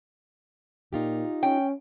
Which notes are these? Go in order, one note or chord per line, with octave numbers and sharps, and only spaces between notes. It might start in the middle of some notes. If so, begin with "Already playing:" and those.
A#2 D#4 F4 G4
C#4 G5